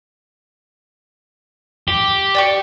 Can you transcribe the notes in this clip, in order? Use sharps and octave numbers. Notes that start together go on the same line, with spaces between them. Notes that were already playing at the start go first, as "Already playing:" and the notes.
G4
D5 G5 C#6